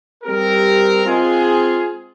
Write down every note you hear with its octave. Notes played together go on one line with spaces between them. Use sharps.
G3 C4 G4 A#4
G#3 C4 F4 G#4